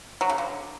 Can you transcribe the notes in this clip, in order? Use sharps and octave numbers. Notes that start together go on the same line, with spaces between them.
F#3
C#3
D3